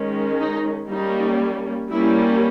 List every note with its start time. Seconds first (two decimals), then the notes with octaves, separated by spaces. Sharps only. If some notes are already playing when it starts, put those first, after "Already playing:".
Already playing: D#3 G#3 C#4
0.40 D#4
0.90 G3 A#3 C#4 D#4
1.90 G3 A#3 C#4 E4